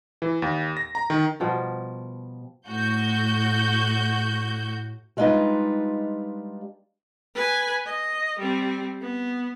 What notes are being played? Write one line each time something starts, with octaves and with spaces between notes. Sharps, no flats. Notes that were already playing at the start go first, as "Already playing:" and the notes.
E3
D#2
A#6
A#5
D#3
B2 F3 G3 A#4
A2 F#4 G6
G3 G#3 D4 D#4 F4 B4
B4 G#5
D#5
G3 C4
B3